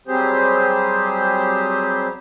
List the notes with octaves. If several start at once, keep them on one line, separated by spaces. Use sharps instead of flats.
F#3 G3 C4 G4 G#4 C5